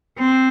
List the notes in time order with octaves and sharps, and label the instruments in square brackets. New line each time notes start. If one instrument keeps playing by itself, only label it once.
[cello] C4